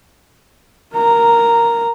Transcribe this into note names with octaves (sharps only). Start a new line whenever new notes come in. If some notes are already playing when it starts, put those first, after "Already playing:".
A#4 A#5